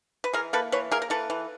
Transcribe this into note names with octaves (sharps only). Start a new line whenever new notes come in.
B4
E3 G#4 A#4
A#3 A4 B4
E3 B4 C#5
A#3 G#4 A#4
A#4
E3 A4 B4
E3